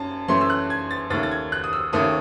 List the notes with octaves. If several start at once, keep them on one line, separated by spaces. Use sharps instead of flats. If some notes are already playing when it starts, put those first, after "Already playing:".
Already playing: F#2 C#4 A5
F#2 E3 A3 C#4 C6
E6
F#6
G#6
A6
D#2 D#3 A3 C#4 A6
A6
G#6
F#6
D#6
E6
D#2 D#3 A3 C#4 D#6